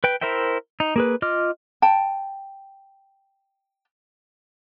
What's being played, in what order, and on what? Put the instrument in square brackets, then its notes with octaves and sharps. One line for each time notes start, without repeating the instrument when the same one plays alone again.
[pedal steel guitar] B4 G5
E4 A#4 C5 E5 G5
D#4
A#3 G#4 B4
F4 D#5 D6 F6
[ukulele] G5 A5